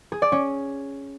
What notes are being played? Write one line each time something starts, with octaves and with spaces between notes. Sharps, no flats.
G#4
D5
C#4